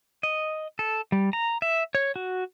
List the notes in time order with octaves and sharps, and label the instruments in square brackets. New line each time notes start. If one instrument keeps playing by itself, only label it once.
[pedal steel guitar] D#5
A4
G3
A#5
E5
C#5
F#4